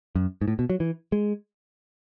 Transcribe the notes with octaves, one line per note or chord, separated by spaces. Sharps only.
F#2
G#2
A2
B2
F#3
E3
G#3